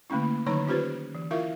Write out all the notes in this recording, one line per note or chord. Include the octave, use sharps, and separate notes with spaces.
D3 A3 A#3 C#4 E4
D3 D#3 F#3 D#4 C#5 A#5
C#4 F4 G4 B4 C5
E3
E4 F4 A#4 E5 F5